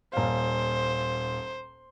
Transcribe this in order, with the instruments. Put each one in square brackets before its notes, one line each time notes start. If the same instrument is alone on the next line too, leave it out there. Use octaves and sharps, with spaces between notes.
[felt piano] D#1 F5 [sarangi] C5